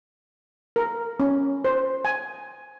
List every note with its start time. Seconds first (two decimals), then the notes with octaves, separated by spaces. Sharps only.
0.76 A#4
1.20 C#4
1.65 C5
2.05 G#5